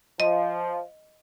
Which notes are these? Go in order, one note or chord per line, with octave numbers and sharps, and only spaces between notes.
F3 D#5